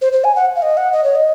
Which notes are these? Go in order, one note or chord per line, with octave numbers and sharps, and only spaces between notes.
C5
C5
G#5
F#5
F5
D#5
F#5
D#5
C#5
D#5